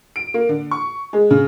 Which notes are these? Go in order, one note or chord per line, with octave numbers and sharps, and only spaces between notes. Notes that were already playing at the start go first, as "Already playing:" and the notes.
D7
A#3
D3
C#6
G#3
C#3